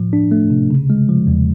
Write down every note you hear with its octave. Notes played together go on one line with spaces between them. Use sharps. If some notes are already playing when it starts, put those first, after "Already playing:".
Already playing: A2 F3
D4
A3
C3
C#3
G#3
F3
E2